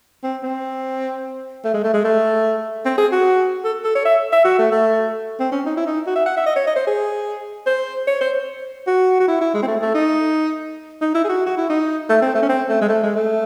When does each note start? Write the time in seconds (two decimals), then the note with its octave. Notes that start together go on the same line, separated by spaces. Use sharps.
0.24 C4
0.43 C4
1.64 A3
1.74 G#3
1.84 A3
1.94 G#3
2.04 A3
2.85 C4
2.98 G#4
3.12 F#4
3.65 A4
3.84 A4
3.95 C#5
4.05 E5
4.32 E5
4.45 F#4
4.59 A3
4.71 A3
5.40 C4
5.52 C#4
5.66 D#4
5.77 E4
5.87 D#4
6.07 F#4
6.16 E5
6.26 F#5
6.37 E5
6.46 D#5
6.56 C#5
6.67 D#5
6.76 C5
6.87 G#4
7.66 C5
8.07 C#5
8.21 C5
8.87 F#4
9.20 F#4
9.28 E4
9.41 E4
9.54 G#3
9.63 C4
9.67 A3
9.82 A3
9.94 D#4
11.02 D#4
11.15 E4
11.24 G#4
11.29 F#4
11.46 F#4
11.57 E4
11.69 D#4
12.09 A3
12.22 C4
12.35 A3
12.43 C#4
12.49 C4
12.69 A3
12.81 G#3
12.89 A3
13.03 G#3
13.16 A3